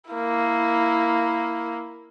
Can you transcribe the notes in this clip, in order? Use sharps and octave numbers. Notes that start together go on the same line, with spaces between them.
A#3 E4